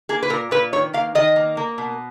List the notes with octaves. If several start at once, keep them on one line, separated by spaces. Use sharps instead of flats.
A#3 G#4
B4
A#2 A#4
A#2 B4
D#3 C#5
A#3 F5
D#3 D#5
A#3
A#3
B2